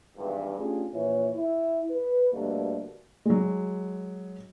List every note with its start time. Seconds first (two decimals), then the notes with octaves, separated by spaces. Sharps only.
0.16 G#1 E2 G2
0.57 A3 C#4 D4 F4 G4 G#4
0.93 A#1 A#2 E3 E4 C#5
1.33 E4
1.90 B4
2.32 D2 G2 B2 D3 A#3
3.26 F#3 G#3